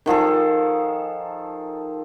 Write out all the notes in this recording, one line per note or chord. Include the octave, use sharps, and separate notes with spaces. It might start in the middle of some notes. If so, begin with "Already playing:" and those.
D#3 F3 G#4 A4